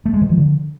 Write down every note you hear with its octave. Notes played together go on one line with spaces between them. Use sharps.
A3
G#3
D#3
F3
D3